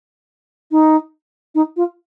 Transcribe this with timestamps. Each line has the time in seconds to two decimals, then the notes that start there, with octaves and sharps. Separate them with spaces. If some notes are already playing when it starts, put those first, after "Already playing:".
0.71 D#4
1.55 D#4
1.77 F4